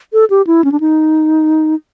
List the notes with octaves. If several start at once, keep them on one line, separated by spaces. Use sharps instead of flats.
A4
G4
E4
C#4
D4
D#4